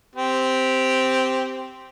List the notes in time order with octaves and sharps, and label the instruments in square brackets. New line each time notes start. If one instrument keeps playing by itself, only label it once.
[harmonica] C4 G4